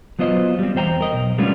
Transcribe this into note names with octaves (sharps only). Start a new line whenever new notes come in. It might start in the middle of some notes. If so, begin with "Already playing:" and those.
F#3 B3 F4 C5 D#5
G3 C4
E2 E3 C5 G5 A#5
A#4 D#5
B1
G3 A3 B3 C#4 D4 F4